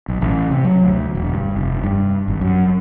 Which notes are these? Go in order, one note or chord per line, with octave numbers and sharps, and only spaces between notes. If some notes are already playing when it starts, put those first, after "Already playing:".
B1
A1
C3
F#3
D2
E1
G2
F1
G2
G#1
F#2